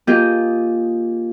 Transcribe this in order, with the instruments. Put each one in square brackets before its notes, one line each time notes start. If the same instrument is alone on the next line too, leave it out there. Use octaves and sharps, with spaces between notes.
[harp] A#3 F4 G4 G#4 D#5 G5